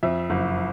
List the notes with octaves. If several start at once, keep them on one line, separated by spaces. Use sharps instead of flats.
F2 E5
F#1